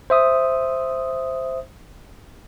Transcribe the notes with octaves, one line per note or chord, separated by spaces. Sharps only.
C5 E5 D#6